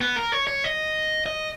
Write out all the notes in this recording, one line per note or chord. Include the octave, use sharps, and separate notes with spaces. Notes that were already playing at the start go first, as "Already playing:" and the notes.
B3
A#4
C#5
C#5
D#5
D#5